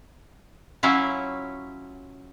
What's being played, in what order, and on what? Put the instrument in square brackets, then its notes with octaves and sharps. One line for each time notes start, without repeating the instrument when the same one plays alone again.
[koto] F#3 C#4 E4 F4